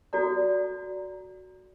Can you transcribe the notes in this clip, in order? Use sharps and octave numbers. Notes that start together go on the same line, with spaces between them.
F#4 A4 D5 A#5